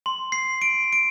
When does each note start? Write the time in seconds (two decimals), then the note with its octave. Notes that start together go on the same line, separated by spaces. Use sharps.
0.06 C6
0.32 C7
0.62 D7
0.93 D7